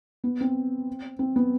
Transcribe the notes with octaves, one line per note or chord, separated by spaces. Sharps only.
B3
C4
C4
B3